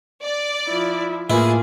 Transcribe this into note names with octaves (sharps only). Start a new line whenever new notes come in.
D5
F3 E4
A2 A#3 E4 F4 G#4 B4